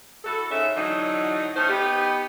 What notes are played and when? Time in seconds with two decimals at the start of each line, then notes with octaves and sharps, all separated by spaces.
0.25 E4 F#4 A4
0.51 G#2 C#3 C#4 E5
0.76 D3 E3 F#3 D#4
1.55 A3 C#4 D#4 C5
1.69 B3 D#4 G4